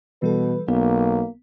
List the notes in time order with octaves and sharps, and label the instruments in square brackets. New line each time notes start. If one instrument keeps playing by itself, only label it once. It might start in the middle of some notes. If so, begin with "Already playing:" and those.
[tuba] B2 [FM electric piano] E3 G3 A4 [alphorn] B4
[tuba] B1 [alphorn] A#3 [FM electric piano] B3